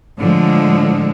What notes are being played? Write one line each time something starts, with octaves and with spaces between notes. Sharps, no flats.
A2 D3 F3 G#3